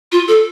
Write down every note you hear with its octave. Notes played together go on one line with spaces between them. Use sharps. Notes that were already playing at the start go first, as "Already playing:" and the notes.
F4
A4